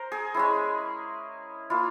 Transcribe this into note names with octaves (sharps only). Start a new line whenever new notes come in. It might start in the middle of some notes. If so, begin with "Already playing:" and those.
Already playing: A#4 C5
G#4
G#3 C#4 E4
A#3 E4 F4